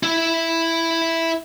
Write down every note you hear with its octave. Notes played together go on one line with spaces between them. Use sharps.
E4 E5